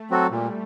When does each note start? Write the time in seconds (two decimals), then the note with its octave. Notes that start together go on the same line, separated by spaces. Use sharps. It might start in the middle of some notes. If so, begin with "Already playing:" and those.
Already playing: A3
0.10 F#3 C4 F#4 A4
0.31 A#2 G3